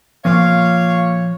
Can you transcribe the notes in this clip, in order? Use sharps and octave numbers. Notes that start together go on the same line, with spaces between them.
A#2 F3 C#5 F5